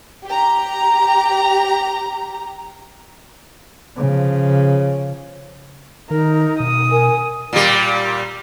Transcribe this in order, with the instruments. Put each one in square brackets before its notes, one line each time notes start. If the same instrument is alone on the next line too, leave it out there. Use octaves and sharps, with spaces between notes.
[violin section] G4 A#5
[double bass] C#3 F3
[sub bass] D#3 [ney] D#4 [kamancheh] A#4
[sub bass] B2 [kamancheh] D#6
[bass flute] A#4 [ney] G#5
[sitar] A#2 G3